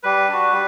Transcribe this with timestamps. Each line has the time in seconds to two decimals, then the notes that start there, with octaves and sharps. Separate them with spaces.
0.03 G3 B4
0.28 D4 F#4
0.53 G3